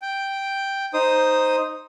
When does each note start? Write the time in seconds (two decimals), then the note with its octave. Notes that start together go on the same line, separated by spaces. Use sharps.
0.02 G5
0.94 D#4 C5 D#6